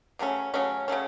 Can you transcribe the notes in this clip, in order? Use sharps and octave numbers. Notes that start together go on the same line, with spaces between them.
C#3 F#3 A3 C#4
C#3 F#3 A3 C#4
C#3 F#3 A3 C#4